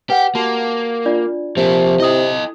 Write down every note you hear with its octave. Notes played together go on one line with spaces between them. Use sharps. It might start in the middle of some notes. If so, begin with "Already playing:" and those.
G4 B4 F#5
A#3 F#4 G4 A5
D4 F4 D5
C3 F3 A#3
E4 A4 D#5 D#6